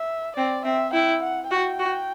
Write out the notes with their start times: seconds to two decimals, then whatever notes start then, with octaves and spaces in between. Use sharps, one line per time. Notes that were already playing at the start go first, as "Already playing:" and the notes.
Already playing: E5
0.36 C4 D5
0.65 C4 E5
0.93 E4 G5
1.23 F#5
1.51 F#4 G5
1.79 F#4